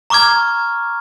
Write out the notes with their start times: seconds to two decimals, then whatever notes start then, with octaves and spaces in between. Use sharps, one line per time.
0.10 A#5 C#6 D6 F6 G#6